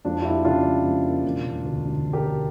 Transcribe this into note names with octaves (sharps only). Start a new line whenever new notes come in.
F2 D4 F4
F4
A#3 E4 G4
C#3 D4 F4
G3
F2
A#3
E1
E1
D2
D3
E1
G4 A#4
E1